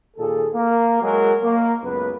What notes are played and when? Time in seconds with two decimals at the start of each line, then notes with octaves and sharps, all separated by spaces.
0.17 D#2 A#2 G#4 A4
0.53 A#3 A#4
1.02 F#3 G#3 F#4 G#4 A#4
1.43 A#3
1.83 C#2 F#2 B3 B4